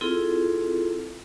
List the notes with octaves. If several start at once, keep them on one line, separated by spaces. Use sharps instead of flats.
C4 E4 F4 G#4 A4